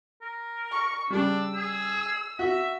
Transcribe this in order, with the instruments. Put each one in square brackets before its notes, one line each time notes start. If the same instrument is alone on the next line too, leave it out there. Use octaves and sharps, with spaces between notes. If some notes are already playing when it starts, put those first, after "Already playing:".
[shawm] A#4
[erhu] C#6
[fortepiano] C#3 G3 [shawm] D4 [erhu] E6
[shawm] G#4
[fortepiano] F#4 [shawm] E5